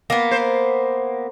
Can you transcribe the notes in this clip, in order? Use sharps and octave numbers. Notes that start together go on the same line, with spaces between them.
A#3 B3
C5